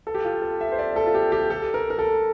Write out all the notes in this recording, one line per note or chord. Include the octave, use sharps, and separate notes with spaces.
A4
G4
F4
A4
E5
C5
D5
A4
F4
G4
G4
A4
A#4
A#4
A4